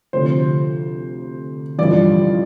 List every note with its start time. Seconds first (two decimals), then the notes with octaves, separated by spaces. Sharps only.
0.13 D2 C3 F3 C5
1.79 A1 G2 F3 D5